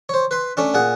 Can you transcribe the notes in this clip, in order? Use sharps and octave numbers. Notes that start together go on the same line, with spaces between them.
C5 C#5
B4 C6
A3 C#4 D4
A#2 G#4 F#5